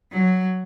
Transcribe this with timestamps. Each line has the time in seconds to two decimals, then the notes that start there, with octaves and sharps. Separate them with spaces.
0.12 F#3